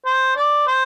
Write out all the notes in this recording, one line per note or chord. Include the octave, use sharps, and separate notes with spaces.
C5
D5
C5